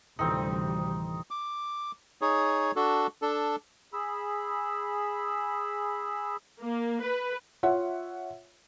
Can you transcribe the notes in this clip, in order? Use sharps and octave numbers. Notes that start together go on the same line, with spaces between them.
D2 A2 C3 D#3 E3 G3 C4 D#4
D6
D#4 G#4 C#5
D4 F#4 A4
D4 A4
G#4 B5 E6
A#3
B4
F4 C#5 E5 F#5